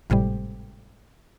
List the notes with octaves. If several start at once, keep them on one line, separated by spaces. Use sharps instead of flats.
G#1 A2 C3 G3